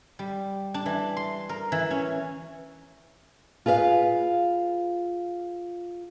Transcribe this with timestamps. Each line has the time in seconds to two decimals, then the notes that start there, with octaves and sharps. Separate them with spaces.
0.19 G3
0.74 D4
0.86 E3
1.17 C6
1.49 A#4
1.72 E3
1.91 C#4
3.66 F4 G#4 B4 D#5 F5